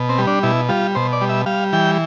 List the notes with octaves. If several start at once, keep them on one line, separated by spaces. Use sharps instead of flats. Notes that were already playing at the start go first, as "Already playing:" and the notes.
Already playing: B2
C4
G3
D4
B2 E4
G3 F4
B2 C5
D5
G3
E5
G3 F5
E3 G5